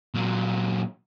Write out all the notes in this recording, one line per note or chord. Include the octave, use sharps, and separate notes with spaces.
A#2 F#3